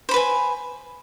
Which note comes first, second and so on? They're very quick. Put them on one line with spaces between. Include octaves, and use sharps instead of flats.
C5 B5 B4 G#5